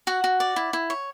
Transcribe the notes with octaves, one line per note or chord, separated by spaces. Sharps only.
F#4 F#5
F#4
D5
E4
E4
C#5